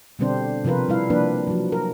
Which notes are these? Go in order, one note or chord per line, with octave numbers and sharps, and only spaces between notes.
B2 D3 G3 C4 D4 C5
C3 F3 F4 A#4 B4
G3 E4 F5
F3 A#3 D4 B4
F3 F#3
A#4